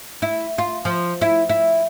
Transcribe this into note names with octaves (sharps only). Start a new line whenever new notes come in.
E4
F4
F3
E4
E4